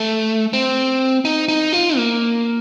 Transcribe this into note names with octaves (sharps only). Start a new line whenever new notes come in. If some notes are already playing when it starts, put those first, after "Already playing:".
Already playing: A3
C4
D#4
D#4
F4
A#3